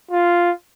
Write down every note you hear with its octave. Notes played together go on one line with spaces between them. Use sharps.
F4